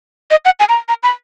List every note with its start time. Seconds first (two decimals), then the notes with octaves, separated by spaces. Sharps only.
0.31 D#5
0.45 F#5
0.60 G#5
0.69 A#5
0.89 A#5
1.03 B5